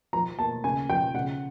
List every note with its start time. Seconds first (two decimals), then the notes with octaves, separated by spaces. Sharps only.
0.13 F3 A#5
0.39 A#3 A5
0.64 C#3 G#5
0.89 F3 G5
1.14 C#3 F#5